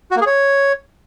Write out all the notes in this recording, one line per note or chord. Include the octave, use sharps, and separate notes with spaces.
F#4
A#3
G#4
C#5